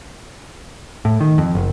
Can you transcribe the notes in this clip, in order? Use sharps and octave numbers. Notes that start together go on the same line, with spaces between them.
A2
D#3
F2
F#1